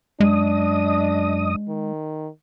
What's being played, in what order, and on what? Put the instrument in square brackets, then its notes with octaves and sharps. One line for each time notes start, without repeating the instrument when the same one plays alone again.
[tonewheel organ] F#2 D#5 D#6 [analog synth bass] G#3 [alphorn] D4
[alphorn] D#3